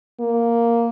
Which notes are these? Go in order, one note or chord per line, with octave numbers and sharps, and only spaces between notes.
A#3